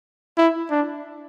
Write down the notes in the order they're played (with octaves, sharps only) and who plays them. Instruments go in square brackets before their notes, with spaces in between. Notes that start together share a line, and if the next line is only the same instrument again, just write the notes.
[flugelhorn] E4
D4